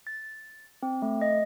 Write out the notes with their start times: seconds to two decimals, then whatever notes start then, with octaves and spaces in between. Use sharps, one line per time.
0.07 A6
0.83 C4
1.02 A3
1.22 D#5